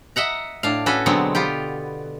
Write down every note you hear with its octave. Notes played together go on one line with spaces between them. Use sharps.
D#5 E5 F#5 A#5
A2 D4 F5
C#4 F#4 A4 B4
B2 D3 F#3 G#3 B3 C4
B3 F4 G4